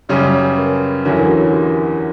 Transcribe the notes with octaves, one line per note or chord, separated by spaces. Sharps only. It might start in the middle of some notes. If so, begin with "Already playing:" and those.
F#2 C#3 G3 C#4 D5
D5
C#5
B4
A#4
E2 D3 F#3 C#4 E4 A#4
A#4
F#4
F#4
G4